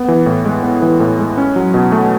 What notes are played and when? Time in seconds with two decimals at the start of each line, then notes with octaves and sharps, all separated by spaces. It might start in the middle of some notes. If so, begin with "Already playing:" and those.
Already playing: B3
0.08 E3
0.26 A2
0.45 G#3
0.63 B3
0.82 E3
1.00 A2
1.19 G#3
1.38 C#4
1.56 F#3
1.74 B2
1.92 A3